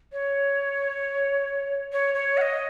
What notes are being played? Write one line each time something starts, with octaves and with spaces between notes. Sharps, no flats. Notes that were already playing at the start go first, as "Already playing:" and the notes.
C#5
C#5
C#5
F#5
D#5